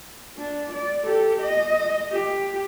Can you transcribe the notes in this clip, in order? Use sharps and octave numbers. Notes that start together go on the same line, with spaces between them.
D4
D5
G4 A4
D#5
G4